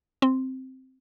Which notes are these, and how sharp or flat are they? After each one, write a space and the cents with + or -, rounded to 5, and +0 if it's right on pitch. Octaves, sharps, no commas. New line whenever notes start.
C4 +0